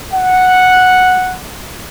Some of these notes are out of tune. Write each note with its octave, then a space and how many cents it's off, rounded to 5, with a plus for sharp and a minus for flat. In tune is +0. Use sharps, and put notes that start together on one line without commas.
F#5 -5